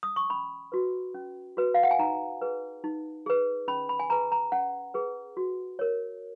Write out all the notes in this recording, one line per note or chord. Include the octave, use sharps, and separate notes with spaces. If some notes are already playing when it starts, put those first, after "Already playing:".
D#6
C#6
C#4 B5
F#4 B4
C#4
F#4 B4
F5
F#5
G#5
D#4 A#5
G#4 B4
D#4
G#4 B4
C#4 B5
B5
G#5
G#4 B4 A#5
A#5
C#4 F#5
G#4 B4
F#4
A#4 C#5